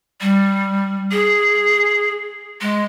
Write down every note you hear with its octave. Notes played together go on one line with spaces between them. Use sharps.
G3
G#4
G#3